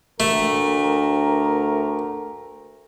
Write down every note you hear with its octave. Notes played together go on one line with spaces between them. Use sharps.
D2 A3 A#4